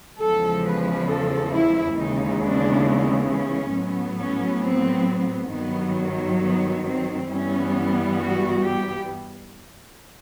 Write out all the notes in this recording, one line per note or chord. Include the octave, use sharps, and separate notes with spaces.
E2 C#3 F3 G#3 A4
B4
A4
E4
D#2 C#3 E3 G#3 B3 D#4
D4
C#4
A2 F#3 B3
C#4
C4
G2 D#3 F#3 B3
B3
C4
G2 E3 G3 B3 C#4
F#4
G4